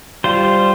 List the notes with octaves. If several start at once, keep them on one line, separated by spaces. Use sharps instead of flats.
G3 F4 C5